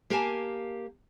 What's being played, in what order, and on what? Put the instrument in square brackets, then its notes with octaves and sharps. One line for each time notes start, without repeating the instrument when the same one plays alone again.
[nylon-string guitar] A#3 G4 A#4 F5 G#5 A5